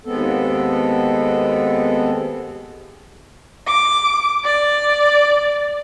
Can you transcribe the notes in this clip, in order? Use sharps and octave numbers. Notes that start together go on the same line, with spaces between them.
D#2 G#3 B3 C4 A4
D6
D5